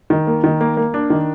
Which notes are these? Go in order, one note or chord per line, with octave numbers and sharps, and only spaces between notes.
D#3
A#3
D#3
A#3
A#3
D4
D#3